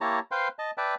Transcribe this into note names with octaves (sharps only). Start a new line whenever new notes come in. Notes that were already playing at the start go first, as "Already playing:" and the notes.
A#3 E4 G4 C#5 A5 A#5
B4 C5 F5 G5 C6
D#5 A5
B4 D5 E5 G5 A5